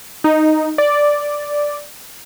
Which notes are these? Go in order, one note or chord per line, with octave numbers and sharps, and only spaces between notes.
D#4
D5